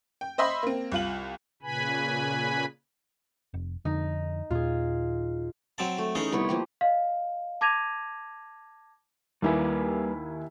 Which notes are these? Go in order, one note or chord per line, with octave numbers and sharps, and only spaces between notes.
G5
C5 D#5 E5 B5 C6
A#3 C4
C2 F4 F#7
A#2 C#3 B4 G#5 B5
F1
F2 D3 D#4
D#2 A#2 F4 G#4
F#3 C4 A5
A3
E3 C#4 D#4 G#4 A4
C2 B3 E4 C#5
F3 A#3 G4
D#5 F5
A5 D6 G#6 A#6 D#7 F7
D#2 G3 A#3 E4 B4 G#5